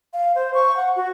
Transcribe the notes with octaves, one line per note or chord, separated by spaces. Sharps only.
F5
C5
C#6
F#5
F#4